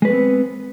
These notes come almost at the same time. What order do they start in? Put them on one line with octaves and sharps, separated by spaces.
G#3 B4 A3 B3 C4